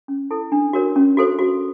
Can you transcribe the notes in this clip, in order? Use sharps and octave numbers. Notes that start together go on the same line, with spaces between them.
C#4
E4 A4
D4
F#4 A#4 C#5
C#4
F#4 A4 C5
F#4